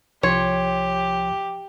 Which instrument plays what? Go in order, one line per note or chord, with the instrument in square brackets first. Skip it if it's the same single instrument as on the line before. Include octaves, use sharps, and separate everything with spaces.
[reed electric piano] C2 F3 C6 [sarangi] G4 [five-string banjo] C#5